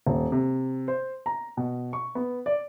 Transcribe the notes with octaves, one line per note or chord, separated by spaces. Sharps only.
D#1
C3
C5
A#5
B2
C#6
B3
D5